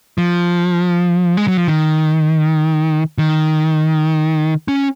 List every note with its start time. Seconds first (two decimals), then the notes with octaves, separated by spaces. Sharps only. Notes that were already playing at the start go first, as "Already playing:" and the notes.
0.18 F3
1.37 G#3
1.48 F#3
1.57 F3
1.68 D#3
3.18 D#3
4.68 C#4